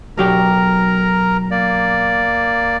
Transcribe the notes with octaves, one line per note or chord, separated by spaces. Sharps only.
B1 F#3 G4 A#4 A#5
A#3 D5